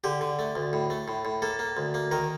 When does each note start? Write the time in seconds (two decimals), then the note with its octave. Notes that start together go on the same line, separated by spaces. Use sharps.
0.04 D3 G4
0.21 D3
0.39 A3
0.55 D2
0.73 A2
0.90 A3
1.08 A2
1.25 A2
1.42 A#3 A4
1.59 A#3
1.77 D2
1.94 A#3
2.11 D#3 A#4